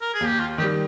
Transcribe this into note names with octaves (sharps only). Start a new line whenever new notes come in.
A#4
G#4
D#2
G4
F4
D#3 G3 G4